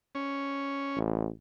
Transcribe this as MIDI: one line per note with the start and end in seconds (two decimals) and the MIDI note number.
0.15 0.99 61
0.97 1.29 33